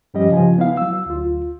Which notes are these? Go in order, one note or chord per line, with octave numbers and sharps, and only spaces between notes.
G2 F3 G3 C#4 G4 D#5
C#3 F3 G#5
B3 E4 F5
F#3 E6
D2 F4